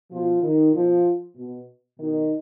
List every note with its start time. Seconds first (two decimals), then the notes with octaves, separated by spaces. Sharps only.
0.11 B2 F3 F4
0.43 D#3 D#4
0.73 B2 F3 F4
1.36 B2
1.98 B2 D#3 D#4